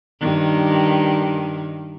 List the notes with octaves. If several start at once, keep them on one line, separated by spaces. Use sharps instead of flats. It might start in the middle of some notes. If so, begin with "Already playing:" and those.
G2 D#3